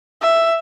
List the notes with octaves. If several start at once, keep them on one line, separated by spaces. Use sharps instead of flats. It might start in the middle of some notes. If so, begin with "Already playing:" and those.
E5